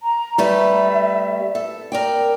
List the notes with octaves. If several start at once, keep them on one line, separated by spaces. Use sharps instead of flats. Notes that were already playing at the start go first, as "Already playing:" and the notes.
A#5
G3 A3 B4 E5
A4
A#4 D5 G5